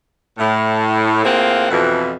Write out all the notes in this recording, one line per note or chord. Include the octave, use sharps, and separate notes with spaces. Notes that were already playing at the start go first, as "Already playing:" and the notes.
A2
A2 A#3 C4 F4 G#4 F#5
F2 B2 E3